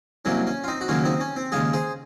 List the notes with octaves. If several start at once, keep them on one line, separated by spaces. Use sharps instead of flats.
C2 C3 F#3 A#3 C#4
C#4
F4
C4 D#4
F#4
D#2 C#3 F#3 A#3 C#4 F4
C4 D#4
C#4
C4
D#2 C#3 G#3 F4 G#4
G#4 C5